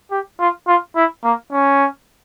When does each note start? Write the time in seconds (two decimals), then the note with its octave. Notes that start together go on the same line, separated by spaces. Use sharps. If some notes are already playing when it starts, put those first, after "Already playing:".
0.11 G4
0.40 F4
0.67 F4
0.96 E4
1.24 A#3
1.52 C#4